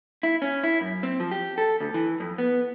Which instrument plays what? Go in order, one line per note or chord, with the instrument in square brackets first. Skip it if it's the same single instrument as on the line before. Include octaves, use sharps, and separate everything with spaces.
[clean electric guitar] E4
C#4
E4
F#2
C4
F3
G4
A4
D2
E3
F2
B3